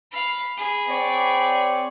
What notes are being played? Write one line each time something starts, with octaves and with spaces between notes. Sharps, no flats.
F5 B5
G#4 B5
C4 C#5 D5